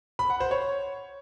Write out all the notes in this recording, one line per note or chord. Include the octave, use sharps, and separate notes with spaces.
B5
F#5
C5
C#5